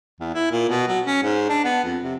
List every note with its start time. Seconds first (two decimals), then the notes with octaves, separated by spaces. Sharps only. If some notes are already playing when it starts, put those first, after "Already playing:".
0.20 E2
0.34 E4
0.51 A#2
0.69 B2
0.88 F#3
1.06 C#4
1.23 G#2
1.49 D4
1.65 B3
1.84 F2
2.04 C3